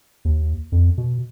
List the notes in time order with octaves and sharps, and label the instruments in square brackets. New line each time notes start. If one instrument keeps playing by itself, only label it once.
[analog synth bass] D#2
F2
B2